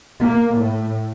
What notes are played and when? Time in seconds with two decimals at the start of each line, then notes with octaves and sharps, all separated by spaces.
0.22 A#3
0.55 A2